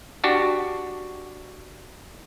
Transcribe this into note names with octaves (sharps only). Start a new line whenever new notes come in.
D4 F#4 G4 A5